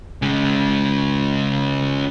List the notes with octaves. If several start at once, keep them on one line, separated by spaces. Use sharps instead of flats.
C#3 G#3